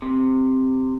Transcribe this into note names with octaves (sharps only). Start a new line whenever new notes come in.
C3